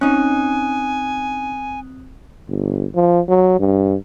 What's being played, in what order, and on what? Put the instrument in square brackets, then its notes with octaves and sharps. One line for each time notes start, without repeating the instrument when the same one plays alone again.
[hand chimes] C4 D#6 F#6 [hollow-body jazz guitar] C#4 D#4 [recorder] G#5
[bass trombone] G1
F3
F#3
G2